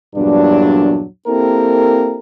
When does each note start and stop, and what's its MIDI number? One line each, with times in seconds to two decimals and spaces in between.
0.15 1.03 40
0.15 1.03 43
0.15 1.03 46
0.15 1.03 54
0.15 1.03 62
1.27 2.20 58
1.27 2.20 60
1.27 2.20 64
1.27 2.20 67
1.27 2.20 69
1.27 2.20 70